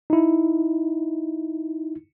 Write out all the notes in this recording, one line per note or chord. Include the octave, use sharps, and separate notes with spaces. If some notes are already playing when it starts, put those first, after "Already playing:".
D#4 E4